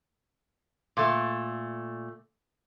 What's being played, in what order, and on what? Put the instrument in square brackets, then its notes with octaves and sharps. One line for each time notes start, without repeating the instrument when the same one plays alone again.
[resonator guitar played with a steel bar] A#2 A3